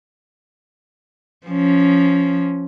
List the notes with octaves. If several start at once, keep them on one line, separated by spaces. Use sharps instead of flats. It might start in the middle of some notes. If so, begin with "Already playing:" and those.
F3 C#4